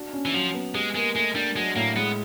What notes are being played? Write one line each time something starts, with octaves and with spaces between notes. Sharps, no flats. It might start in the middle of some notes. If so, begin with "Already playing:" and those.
Already playing: D4 F#4
C#4
E3
F3 F#3
B3
G#3 G4
G#3 A#3
G#3 A3
G3 D4
F#3 G#3
A2 A#3
G#3 B3